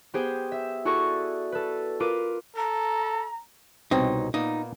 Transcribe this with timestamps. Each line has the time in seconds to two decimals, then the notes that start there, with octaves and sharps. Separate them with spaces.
0.14 B3 G4 G#4 C5 G5
0.52 E5
0.85 E4 F#4 G#4 A4 D5 C#6
1.52 A4 B4
2.00 F4 A#4 B4 D6 D#7
2.56 A4 A#5
3.91 C2 B2 C4 D#4 C#5
4.34 A#2 A#3 B3 D#4